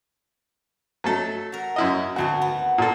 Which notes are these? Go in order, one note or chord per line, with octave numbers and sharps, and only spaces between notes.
F#3 A3 A4
F#4 A#4
F#2 E4 D#5
D2 D#3 B3 C4 F#4
B3
A#2 A4